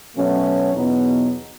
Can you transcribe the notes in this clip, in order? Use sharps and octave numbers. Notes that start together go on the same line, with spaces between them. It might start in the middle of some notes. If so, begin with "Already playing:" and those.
B2 F#3 A3 C#4
E2 B2 F#3 B3 D#4